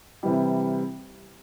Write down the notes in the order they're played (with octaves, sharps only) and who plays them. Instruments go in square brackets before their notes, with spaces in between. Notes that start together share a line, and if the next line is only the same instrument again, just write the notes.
[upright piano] C3 E3 G3